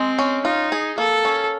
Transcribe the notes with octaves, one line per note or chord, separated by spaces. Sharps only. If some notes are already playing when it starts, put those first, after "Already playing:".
Already playing: G#3 C4
C#4
D#4 F4
G#4
A#3 A4
C#4